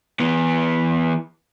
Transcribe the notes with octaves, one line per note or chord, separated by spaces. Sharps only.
E3 B3